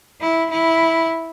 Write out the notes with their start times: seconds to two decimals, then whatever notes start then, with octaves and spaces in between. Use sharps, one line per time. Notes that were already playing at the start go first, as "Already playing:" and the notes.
0.21 E4
0.51 E4